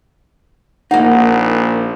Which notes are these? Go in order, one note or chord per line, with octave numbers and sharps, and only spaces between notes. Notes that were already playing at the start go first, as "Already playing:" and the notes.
A#1 A#3 D#4 F#5